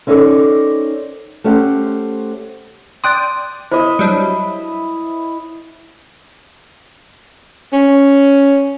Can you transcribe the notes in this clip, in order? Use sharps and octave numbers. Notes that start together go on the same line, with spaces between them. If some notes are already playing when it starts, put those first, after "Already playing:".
C4 C#4 D#4 A4 A#4 D5
A3 C#4 G4 C5 F#5
D5 G5 C6 D#6 F#6
E4 C5 D#5 E5
F#3 G3 D4
C#4